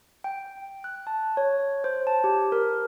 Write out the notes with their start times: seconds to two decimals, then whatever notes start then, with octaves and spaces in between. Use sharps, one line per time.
0.24 G5
0.84 F#6
1.07 A5
1.37 C#5
1.84 C5
2.07 A5
2.24 G4
2.52 A#4